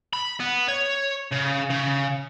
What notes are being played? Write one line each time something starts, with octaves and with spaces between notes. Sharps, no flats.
B5
B3
C#5
C#3
C#3